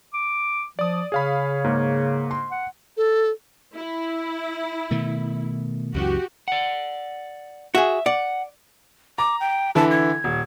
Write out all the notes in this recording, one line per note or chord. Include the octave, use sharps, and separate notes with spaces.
D6
F3 D5 D#6
C#3 G#4 C#5 F5 B5
G#2 A#3
C6
F#5
A4
E4
B2 D#3 A3
C#2 F#2 E3 F#4 G4
D5 F#5
F#4 G#4 E5
D5 F#5
A#5 D6
G5
D3 E3 E4 A5
G#6
D#1